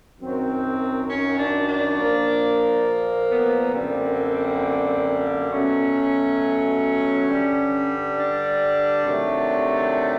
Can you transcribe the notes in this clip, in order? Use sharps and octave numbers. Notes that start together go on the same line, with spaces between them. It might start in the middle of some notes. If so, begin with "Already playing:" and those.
F#2 D#3 F#3 C4
C#4
D4
D4
A#2 F3 A#3
B3
F#2 D3 G3 A#3 C4
B2 F#3 A3 C#4
G2 D3 G3
D4
C3 D#3 F#3 A3